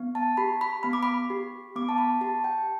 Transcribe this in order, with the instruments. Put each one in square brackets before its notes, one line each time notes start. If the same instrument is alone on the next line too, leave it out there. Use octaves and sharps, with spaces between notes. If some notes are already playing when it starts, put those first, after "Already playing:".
Already playing: [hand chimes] B3
A5
G4 B5
B5
B3 B5
D6
B5
G4
B3 D6
A5
B5
G4 A5
G5